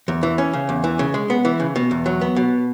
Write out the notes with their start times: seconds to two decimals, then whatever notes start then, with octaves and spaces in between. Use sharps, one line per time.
0.08 E2
0.23 E3
0.38 C#4
0.54 C#3
0.69 E2
0.84 E3
0.99 C#3
1.14 G#3
1.30 B3
1.45 E3
1.60 C#3
1.76 B2
1.91 E2
2.06 F#3
2.21 B3
2.36 B2